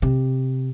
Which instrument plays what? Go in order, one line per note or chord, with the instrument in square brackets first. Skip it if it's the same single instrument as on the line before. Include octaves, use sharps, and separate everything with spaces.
[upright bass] C3